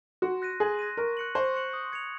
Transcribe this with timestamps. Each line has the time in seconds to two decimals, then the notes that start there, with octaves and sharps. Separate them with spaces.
0.22 F#4 C6
0.42 F#6 A#6 D#7
0.60 G#4 C6
0.79 F#6 A#6 D#7
0.97 A#4 C#6
1.17 F#6 C#7 F#7
1.35 C5 C#6
1.54 F#6 C#7 F#7
1.73 D#6
1.92 G#6 C#7 F7